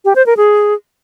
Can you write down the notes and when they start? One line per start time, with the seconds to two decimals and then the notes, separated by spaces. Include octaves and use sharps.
0.05 G4
0.16 C5
0.26 A#4
0.37 G#4